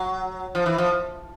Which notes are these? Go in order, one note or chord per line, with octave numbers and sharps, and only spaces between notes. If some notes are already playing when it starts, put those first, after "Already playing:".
Already playing: F#3
F3
E3
F3